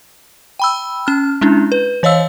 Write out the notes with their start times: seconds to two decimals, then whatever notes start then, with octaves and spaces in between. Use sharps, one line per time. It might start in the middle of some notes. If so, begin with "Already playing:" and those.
0.59 G5 B5 E6
1.07 C#4 F6
1.41 G#3 C#4 D4 E4
1.72 B4
2.03 E3 C#5 D#5 F5 E6